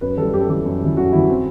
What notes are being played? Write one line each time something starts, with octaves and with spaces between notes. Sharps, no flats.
F#2 B4
E3 G3 A4
F#2 G4
A4
E3 G3 G4
F#2
E3 G3
F#2 F#4
E3 G3 E4
C4